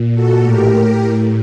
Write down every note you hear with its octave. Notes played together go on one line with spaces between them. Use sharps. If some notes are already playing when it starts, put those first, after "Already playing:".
Already playing: A#2
F#4 A4
A2 G4 A#4
A2